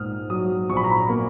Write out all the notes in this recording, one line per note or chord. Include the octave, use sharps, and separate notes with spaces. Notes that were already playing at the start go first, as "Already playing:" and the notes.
Already playing: A#1 G#2 A#3 D#6 F6
F#3 D#6
A#1 C#6
B5
A#5
B5
A#3